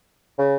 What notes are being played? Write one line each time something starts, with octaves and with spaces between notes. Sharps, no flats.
C#3